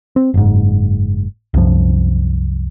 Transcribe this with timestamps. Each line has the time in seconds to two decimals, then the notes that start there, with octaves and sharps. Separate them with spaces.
0.16 C4
0.34 F#1 G#2
1.54 C2 F#2 F3